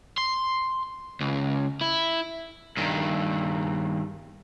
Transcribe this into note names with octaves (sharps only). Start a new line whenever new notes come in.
C6
C#2
E4
G2 D#3